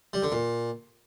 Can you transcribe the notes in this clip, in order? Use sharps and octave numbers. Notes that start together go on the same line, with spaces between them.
G3
D3
A#2